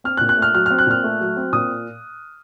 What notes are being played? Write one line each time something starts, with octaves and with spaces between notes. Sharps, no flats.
C4 F6
F#6
A#2
F#6
A3
F6
F#3 F6
F6
C4
F#6
A#2 F6
A3
F#3
C4
A#2 D#6